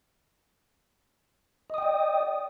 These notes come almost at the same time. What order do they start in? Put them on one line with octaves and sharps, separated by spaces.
D#5 D#6 G5 D5